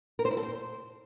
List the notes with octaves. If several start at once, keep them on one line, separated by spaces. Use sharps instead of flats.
A#4
C5
E4
A4
C5